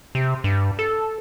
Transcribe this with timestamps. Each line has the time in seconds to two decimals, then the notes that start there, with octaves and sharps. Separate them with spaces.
0.15 C3
0.44 G2
0.79 A4